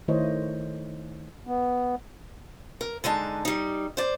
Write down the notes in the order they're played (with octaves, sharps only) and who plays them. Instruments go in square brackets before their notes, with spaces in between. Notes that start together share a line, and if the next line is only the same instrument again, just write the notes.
[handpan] D#3 A3 E4 C5 C#5 D#5
[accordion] B3
[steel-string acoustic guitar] A#4
D3 G#3 D#4 A5
G3 D#4
C5 D5